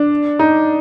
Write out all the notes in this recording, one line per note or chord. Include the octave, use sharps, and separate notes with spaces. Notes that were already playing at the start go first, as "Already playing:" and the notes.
Already playing: D4
D#4